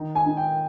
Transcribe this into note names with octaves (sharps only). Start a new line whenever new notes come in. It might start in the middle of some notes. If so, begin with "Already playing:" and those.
Already playing: D#3 D#4
G#5
D#4
G5